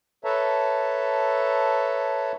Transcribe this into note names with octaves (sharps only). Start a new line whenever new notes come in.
A4 B4 C#5 E5 A5 A#5